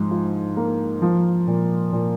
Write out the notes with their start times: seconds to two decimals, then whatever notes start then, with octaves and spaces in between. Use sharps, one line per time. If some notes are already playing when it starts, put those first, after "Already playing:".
Already playing: G#2 F3
0.11 F4
0.57 A#3
1.02 F3
1.47 A#2
1.92 A#2